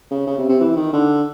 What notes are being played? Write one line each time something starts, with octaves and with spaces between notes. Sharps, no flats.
C#3
C#3
C3
C3
E3
D#3
D3